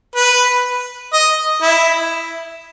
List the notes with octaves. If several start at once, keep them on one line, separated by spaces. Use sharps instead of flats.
B4
D#5
E4